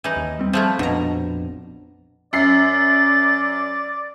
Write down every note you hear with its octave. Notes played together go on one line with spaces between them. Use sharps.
E3 D#4
D#2
G3 C4
F3 A3 E4
A#1 F2 B2 D4 A#5
F#2 D5 A6 C7